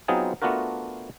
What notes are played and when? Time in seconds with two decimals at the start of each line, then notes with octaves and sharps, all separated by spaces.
0.08 F#3 B3 C4 D#4 F4 G#4
0.42 A3 B3 D4 F4 F#4 A#4